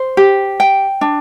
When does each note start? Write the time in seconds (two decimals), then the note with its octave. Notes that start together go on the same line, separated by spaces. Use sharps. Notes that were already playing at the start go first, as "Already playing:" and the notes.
Already playing: C5
0.17 G4
0.60 G5
1.01 D4